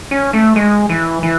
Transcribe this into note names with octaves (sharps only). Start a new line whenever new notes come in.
C#4
A3
G#3
E3
E3